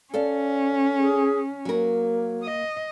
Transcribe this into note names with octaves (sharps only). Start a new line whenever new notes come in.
C#4 A4 D5 F5
G#4
F#3 A#3 A#4
D#5